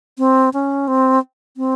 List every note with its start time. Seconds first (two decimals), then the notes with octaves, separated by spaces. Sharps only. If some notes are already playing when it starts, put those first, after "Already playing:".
0.18 C4
0.53 C#4
0.88 C4
1.57 C4